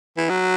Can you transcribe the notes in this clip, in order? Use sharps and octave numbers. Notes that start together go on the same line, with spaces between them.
E3
F#3